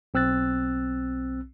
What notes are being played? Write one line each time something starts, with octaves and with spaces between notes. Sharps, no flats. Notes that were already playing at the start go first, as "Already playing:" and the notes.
B1 C4 E6 F#6 A6